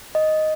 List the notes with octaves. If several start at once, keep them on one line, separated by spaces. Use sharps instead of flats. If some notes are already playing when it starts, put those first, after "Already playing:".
D#5